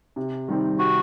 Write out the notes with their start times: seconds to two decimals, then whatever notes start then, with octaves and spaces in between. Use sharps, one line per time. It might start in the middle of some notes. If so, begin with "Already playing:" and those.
0.16 C3
0.48 D#3 G3 C4 D#4
0.79 C3 F#4